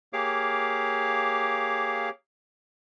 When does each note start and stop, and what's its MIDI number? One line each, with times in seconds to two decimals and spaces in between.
0.13 2.10 58
0.13 2.10 67
0.13 2.10 68
0.13 2.10 73
0.13 2.10 77
0.13 2.10 86